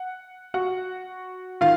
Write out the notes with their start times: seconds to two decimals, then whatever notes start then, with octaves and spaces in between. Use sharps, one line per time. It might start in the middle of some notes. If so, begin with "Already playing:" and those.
Already playing: F#5
0.54 F#4 F#5
1.61 D#3 F4 F5